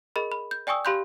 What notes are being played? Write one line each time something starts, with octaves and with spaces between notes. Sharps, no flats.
G#4 A#4 D#5 B5
B5
G6
D5 G5 G#5 C#6 D#6 E6
G4 F5 B5 C6 F#6 G6